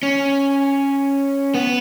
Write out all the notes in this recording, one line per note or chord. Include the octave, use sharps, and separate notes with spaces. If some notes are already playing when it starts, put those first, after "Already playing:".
C#4
B3